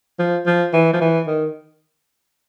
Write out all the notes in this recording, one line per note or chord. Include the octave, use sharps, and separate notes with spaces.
F3
F3
E3
F3
E3
D#3